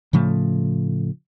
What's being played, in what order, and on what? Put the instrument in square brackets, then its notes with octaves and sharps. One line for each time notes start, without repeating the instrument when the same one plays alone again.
[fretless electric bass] A2 C#3 F3 A3